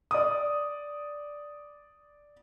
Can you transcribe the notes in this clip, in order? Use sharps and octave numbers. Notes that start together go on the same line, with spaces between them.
D5 D#6